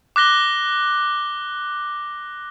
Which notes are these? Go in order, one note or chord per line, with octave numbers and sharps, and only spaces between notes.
D6 F#6 A#6 G7